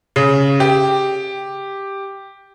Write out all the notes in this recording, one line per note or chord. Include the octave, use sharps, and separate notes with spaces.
C#3
G4